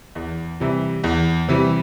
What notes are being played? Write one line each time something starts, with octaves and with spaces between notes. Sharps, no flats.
E2
C3 E3 G3
E2
C3 E3 G3